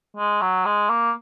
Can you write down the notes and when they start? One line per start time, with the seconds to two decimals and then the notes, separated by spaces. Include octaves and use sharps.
0.17 G#3
0.42 F#3
0.66 G#3
0.90 A#3